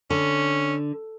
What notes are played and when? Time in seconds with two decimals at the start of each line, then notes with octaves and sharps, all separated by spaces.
0.10 D3 C#4